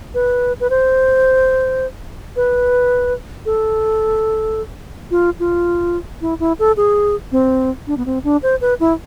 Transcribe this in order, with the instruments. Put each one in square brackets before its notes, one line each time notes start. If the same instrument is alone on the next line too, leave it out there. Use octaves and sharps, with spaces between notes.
[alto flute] B4
B4
C5
B4
A4
F4
F4
E4
E4
A4
G#4
C4
D4
B3
C4
D4
C5
B4
E4